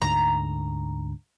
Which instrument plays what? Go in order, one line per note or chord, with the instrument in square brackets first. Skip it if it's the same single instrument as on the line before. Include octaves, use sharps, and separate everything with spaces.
[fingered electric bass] D2 G#2 D3 [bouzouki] A#5